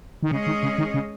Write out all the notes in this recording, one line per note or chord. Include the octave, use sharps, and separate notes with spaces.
D#3
C#3 G#3 C#4 G#4 D#5
D#3
C#3
D#3
C#3